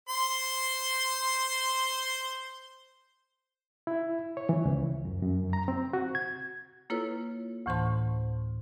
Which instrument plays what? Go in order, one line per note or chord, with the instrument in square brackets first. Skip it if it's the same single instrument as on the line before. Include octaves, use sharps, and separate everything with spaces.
[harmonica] C5 C6
[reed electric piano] E4
C#5
E3
C#2
F#2
F#2
A#5
C4
F#4
G#6
[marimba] A#3 E4 F4 A4 B4 C#5
D2 A2 E3 C5 A5 C6